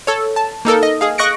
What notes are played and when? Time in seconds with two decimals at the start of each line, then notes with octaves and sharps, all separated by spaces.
0.07 A4 C#5
0.36 A5
0.65 A#3 D#4 A4 A#4
0.83 D#5
1.01 G#4 F5
1.18 D#5 C#6 F#6 A#6 C#7 D7